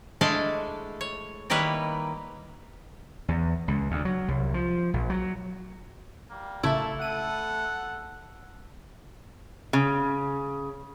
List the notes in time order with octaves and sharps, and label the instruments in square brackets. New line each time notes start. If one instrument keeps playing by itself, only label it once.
[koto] G#3 A3 D4 E4 A4 F5
C#5
D#3 G3 A#3 E4 B4 C#5
[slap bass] E2
C#2
D2
F#3
C2
F3
A#1
F#3
[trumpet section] G3 A#3
[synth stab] A1 C#3 E5 [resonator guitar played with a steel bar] A3 E4 [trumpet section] A#3 A5
[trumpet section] A4 F#5 [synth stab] D#7
[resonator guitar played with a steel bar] C#3